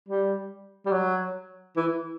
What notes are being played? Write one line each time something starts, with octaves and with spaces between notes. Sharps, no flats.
G3
G3
F#3
E3